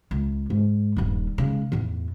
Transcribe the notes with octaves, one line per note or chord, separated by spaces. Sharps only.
C#2
G#2
D#1 G2
C#3 G#3
E2 A2